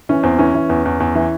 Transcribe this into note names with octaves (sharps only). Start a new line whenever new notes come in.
E3 C#4
E2 C4
E3 C#4
E3
E2
E2
E2
E3